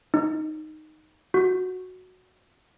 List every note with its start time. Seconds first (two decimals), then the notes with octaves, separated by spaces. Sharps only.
0.14 D#4
1.34 F#4